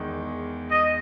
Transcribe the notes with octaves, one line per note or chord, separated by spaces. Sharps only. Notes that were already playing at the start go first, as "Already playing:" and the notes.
Already playing: E2 D#3 G#3
D#5